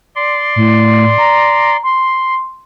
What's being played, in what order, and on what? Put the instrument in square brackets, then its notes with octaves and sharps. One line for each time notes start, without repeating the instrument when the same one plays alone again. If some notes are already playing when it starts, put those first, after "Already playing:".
[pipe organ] D5 C6
[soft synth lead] A2
A#5
C6